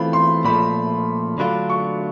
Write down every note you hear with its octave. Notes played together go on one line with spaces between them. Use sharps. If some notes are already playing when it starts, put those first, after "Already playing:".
Already playing: E3 A3 C4 F4 B5
C6
A#2 F3 A3 B5
D3 F#3 A3 D4 F4 B5
C#6